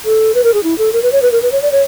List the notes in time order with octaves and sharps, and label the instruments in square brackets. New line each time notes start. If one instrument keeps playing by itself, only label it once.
[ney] A4
B4
A#4
G#4
E4
A4
A#4
B4
C#5
B4
A#4
B4
C#5
D5
C#5